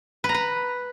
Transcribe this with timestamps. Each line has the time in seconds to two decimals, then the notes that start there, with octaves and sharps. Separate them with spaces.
0.24 B4
0.29 A#5
0.34 B4